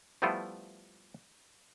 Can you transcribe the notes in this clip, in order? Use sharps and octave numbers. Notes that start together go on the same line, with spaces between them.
F3 G3 A3 B3 E4 F4